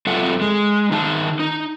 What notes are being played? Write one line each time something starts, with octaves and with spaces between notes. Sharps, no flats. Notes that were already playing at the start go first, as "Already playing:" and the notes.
F#2 C4 F4 A4 E5 F#5
G#3
D#3 D#4 E5 G#5 A5
D#4